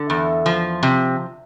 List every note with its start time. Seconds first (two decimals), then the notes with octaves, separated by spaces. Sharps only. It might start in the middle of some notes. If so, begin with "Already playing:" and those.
Already playing: D3
0.10 E2
0.46 F3
0.83 C3